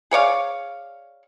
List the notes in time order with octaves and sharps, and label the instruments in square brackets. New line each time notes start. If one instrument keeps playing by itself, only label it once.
[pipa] G#4 C#5 D5 F5